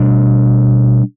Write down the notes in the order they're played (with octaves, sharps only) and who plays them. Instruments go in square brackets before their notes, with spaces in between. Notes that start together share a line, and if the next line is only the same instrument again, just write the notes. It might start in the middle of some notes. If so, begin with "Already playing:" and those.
Already playing: [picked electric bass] B2 G3 D4